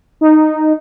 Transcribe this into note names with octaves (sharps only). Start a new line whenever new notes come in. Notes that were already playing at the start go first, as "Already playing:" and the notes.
D#4